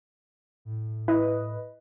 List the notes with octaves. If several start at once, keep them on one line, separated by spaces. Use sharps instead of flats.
A2
E4 B4 D#5